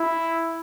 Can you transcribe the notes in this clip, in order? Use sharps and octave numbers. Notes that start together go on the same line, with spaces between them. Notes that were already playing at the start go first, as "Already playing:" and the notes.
Already playing: E4